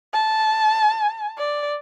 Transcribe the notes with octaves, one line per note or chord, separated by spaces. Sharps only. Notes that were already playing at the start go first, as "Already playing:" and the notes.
A5
D5